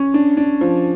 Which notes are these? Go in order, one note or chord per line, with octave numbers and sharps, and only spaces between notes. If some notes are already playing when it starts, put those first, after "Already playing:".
Already playing: C#4
D4
D4
F3